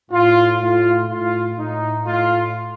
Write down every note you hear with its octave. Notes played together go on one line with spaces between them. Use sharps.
A2 F4
A2 F4
A2 F4
A2 D#4
A2 F4